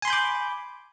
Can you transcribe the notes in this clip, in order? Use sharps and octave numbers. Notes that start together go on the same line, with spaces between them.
G#5 B5 C6 D6 G6